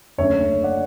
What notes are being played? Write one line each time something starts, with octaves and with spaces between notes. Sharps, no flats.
F#1 F#2 D3 A3 C#5 E5
D5 F#5